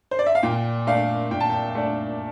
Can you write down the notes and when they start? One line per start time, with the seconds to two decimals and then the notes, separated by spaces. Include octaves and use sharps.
0.11 C5
0.19 D5
0.26 E5
0.35 F5
0.43 A#2 G5
0.87 A3 D4 F5
1.31 A#2 G5
1.40 A5
1.50 G5
1.75 A3 D4